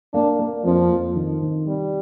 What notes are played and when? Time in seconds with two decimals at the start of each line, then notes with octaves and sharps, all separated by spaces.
0.14 A#3 D4
0.39 A#3
0.65 F2 F3
0.90 F2
1.16 D#3
1.42 D#3
1.67 C3 G3